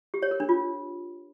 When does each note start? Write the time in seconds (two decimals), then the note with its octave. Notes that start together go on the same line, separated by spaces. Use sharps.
0.14 G4
0.22 C#5
0.31 A#4
0.40 D4
0.49 F4